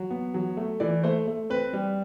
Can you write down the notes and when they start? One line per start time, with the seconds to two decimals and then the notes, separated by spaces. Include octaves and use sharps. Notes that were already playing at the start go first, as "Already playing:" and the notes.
Already playing: F#3
0.10 B3
0.34 F#3
0.57 A3
0.80 E3 D5
1.04 A3 C5
1.28 A3
1.50 C4 B4
1.73 G3